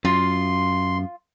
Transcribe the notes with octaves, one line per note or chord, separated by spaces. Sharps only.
F#2 F4 C6